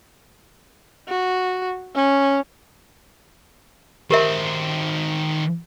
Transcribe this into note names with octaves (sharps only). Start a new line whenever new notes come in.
F#4
C#4
D#3 G4 A#4 C5 E5